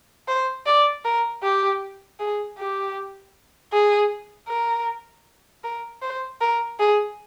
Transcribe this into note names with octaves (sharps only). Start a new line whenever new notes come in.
C5
D5
A#4
G4
G#4
G4
G#4
A#4
A#4
C5
A#4
G#4